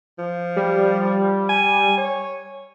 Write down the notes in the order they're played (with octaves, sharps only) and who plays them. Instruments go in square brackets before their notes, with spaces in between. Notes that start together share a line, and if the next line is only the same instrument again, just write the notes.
[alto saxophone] F3
[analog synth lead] G3
[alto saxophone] G#5
C#5